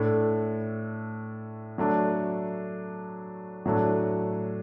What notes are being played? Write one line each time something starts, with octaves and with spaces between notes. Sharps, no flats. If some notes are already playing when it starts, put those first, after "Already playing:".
Already playing: A2 A3 D4 A4
F#3 A3 D4 A4
A2 F#3 A3 D4